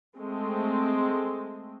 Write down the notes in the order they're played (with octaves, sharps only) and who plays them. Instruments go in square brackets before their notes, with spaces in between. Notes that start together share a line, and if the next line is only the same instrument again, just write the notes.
[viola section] G#3 A3 C4